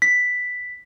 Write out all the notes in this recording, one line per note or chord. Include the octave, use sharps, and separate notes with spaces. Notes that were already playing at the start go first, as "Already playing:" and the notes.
B6